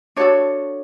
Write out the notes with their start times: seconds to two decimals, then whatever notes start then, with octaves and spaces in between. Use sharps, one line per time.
0.16 D4 F#4 A4 C#5